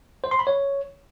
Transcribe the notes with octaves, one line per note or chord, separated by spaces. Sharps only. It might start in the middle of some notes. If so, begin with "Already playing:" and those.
C5
C6
B5
C#5